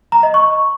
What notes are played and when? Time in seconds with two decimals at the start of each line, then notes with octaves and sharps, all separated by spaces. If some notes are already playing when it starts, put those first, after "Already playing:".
0.12 A#5
0.23 D#5
0.34 C#6